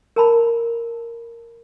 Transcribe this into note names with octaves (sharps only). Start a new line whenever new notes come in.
A#4 A5 B5